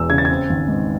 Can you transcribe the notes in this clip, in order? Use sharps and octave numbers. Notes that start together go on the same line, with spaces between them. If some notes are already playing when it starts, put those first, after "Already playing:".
Already playing: E1 E2 E3 E6
C#3 G#6
A6
C4 G#6
G#1
G#2